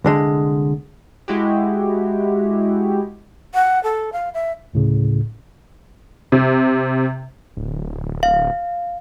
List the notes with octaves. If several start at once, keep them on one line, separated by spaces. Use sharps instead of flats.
C2 D3 G#3
G#3 E4 F#4 G4
F#5
A4
F5
E5
D2 A2 C#3
C3
D1
F5